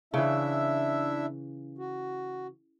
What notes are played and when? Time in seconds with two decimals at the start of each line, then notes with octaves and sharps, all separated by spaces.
0.14 C#3 E3 D4 E4 E5
1.78 F#4